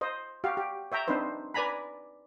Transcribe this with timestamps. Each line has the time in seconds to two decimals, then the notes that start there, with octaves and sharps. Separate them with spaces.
0.01 C5 D#5
0.44 F#4 G4 F5
0.57 G4
0.92 C#5 E5 G5 A#5
1.08 C4 D4 D#4 B4 C5
1.54 B4 D5 G#5 A#5 B5